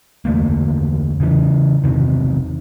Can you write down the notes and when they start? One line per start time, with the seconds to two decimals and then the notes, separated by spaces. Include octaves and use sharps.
0.25 E2 D3 A3 A#3
1.20 C#3 E3
1.84 E2 C3 D#3